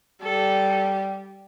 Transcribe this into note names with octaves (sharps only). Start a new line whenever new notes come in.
G3 A4